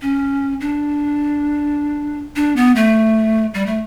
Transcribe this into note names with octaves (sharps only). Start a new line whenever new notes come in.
C#4
D4
D4
B3
A3
G3
A3